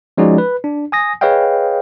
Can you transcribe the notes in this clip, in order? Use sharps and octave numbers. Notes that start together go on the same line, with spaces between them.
F3 G#3 C#4 D#4 F#4 D5
B4
D4
G#5 D#6 A#6
G#4 B4 C#5 D#5 F5 G5